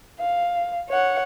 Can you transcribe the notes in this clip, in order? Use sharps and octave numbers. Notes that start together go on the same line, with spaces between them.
F5
C#5 F#5